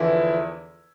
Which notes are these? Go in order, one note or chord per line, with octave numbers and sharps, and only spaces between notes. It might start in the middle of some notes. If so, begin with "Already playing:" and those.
Already playing: E2 D3 E3 F3 E4